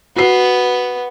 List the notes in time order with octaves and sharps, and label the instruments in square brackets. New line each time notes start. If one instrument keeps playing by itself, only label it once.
[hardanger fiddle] B3 [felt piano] F#4 C7